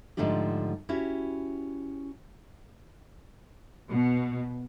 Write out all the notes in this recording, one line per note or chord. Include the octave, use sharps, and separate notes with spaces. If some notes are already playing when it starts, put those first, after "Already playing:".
G#2 D3 F3 A3 D4 G4
C#4 E4 F#4 G4
B2